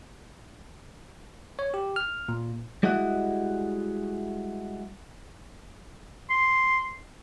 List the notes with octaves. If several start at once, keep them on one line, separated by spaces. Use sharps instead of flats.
C#5
G4
F6
A#2
G3 G#3 E4 F#4 D#5 F#5
C6